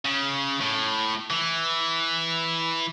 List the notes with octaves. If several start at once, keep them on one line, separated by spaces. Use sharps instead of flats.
C#3
A2
E3